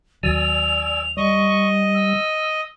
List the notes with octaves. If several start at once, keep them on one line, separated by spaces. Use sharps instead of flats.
D#2 F#3 D5 G#5 E6 F7
G3 D#5 C#6
E6